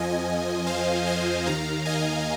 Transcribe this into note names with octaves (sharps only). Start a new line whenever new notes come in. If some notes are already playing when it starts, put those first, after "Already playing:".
Already playing: F2 F3 D#5 G#5
C5 F5
D#5 G#5
D#2 D#3 F5 A#5
D#5 G#5